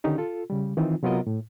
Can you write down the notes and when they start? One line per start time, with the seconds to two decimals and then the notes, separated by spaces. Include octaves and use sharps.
0.04 D3 D#3 C#4 D#4 G4
0.18 F4 A4
0.50 C#3 G3
0.77 D#3 E3 C4 D#4 F4
1.03 C3 F#3 B3 F4 A#4 D#5
1.27 A2